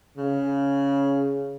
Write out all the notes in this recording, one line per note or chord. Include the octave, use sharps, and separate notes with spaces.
C#3